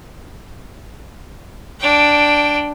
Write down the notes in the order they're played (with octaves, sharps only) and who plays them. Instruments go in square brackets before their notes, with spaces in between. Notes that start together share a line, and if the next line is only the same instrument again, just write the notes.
[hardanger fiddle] D4 G5